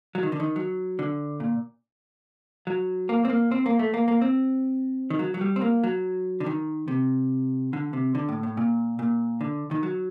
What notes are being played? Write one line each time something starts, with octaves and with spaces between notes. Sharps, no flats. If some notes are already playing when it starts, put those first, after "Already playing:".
F#3
D#3
D3
D#3
F#3
D3
A#2
F#3
A#3
C4
A#3
C4
A#3
A3
A#3
A#3
C4
D#3
F#3
F#3
G3
C4
A#3
F#3
D3
D#3
C3
D3
C3
D3
A2
A2
A#2
A#2
D3
D#3
F#3